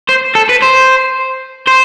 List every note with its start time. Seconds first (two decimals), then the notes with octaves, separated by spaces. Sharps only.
0.09 C5
0.35 A4
0.49 B4
0.62 C5
1.67 C5